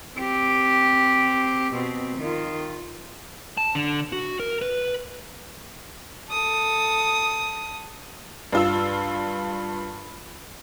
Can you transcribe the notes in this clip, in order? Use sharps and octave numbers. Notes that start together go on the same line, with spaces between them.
C4 G4
B2 C4
D#3 F4
A5
D3
F#4
A#4
B4
A4 D#6
G2 F4 E6